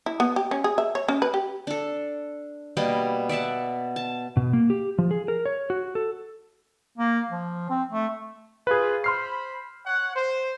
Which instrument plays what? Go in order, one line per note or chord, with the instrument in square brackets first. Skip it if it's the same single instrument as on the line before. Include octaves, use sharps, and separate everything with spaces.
[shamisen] E4
B3
G4
C#4
G#4
E5
C#5
C#4
B4
G4
[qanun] D4 A4
B2 G3 A#3 B3
D5 E5 F#5 A5
A5
[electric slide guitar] B2
A#3
G4
F3
G#4
A#4
C#5
F#4
A4
[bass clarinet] A#3
F3
C4
A3
[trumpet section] F4 [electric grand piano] G#4 B4
[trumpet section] C5 B5 [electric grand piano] C6 F6 C7
[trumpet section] C#5 F#5
C5